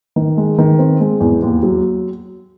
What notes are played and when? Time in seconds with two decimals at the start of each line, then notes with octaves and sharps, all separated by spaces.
0.16 D#3
0.37 G#3
0.58 D#3
0.79 C4
1.00 G#3
1.20 E2
1.42 D#2
1.63 F#3